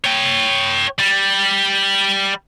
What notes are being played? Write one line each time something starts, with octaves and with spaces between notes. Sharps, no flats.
C#5 G5
G3